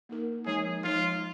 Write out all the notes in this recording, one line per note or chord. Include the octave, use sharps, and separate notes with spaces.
A#3 D#4 A#4
F3 G#3 D#4 G#4 C#5
F3 G#3 D#4 F4 C#5